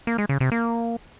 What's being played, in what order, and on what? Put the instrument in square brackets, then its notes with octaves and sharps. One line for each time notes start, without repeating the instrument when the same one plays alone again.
[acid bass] A#3
G#3
C#3
C3
A#3